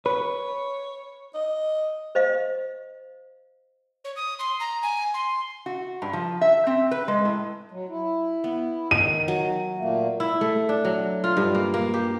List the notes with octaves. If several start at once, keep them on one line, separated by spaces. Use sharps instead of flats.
B4 C#5
D#5
C5 D#5 F5
C#5
D#6
C6
A#5
G#5
C6
F#4
G2
F3
E5
C4
B4
G#3
A2
F#3
E4
B3
D#3 D#7
F#3
A#2 A3 A#3
E4
A3
D4
F#3
F4
G2
A#3
A#3
G4